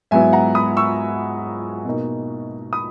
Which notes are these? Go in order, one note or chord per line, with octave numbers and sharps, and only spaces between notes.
G#2 F#3 B3 E4 E5 G#5
F#5 A#5
B5 D#6
C#6 E6
B2 A#3 D#4
B5 D#6